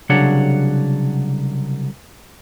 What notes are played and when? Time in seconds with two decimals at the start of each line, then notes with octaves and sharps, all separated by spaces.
0.09 C2 C#3 F#3 D4 C#5 F#5